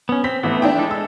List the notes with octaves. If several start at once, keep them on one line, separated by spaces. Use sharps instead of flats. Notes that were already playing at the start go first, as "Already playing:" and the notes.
B3 C#4
C4 B6
A1 A3 B3
D4 E4 G5
G#3 A4
E6